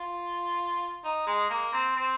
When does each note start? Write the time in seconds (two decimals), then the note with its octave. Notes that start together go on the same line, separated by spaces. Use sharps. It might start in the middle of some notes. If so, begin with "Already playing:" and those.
Already playing: F4
1.05 D#4
1.27 G#3
1.50 A#3
1.73 C4
1.96 C4